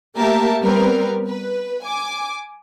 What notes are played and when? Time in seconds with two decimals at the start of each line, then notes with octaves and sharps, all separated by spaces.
0.17 A3 A#3 G4 A#4 E5 A5
0.63 G3 B3 C4 A#4 B4
1.28 B4
1.85 G#5 D6